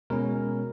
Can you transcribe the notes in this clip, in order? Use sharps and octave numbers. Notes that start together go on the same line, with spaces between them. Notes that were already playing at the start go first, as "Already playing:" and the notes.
B2 G#3 C#4 A#4